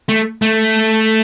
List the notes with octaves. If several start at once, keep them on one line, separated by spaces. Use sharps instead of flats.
A3
A3